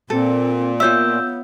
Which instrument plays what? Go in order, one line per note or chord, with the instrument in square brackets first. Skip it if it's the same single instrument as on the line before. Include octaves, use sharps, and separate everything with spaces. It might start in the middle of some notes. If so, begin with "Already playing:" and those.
[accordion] A#2 [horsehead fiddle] C4 [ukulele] A4
[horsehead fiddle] B3 [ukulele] F4 C#5 E5 [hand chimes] E6 G6